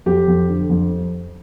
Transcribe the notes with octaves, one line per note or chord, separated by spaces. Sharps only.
F2 G4
F2
D3
F2